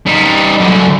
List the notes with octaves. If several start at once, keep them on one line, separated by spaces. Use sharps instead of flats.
G3 D#4
F#2 D3